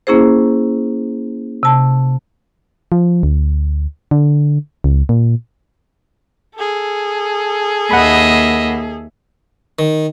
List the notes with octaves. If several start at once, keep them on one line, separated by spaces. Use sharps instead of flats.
A#3 C#4 E4 G#4 C5
C3 A5
F3
D2
D3
C#2
A#2
G#4 A4
D#2 A#3 D#5 E5 F#5 B5
D#3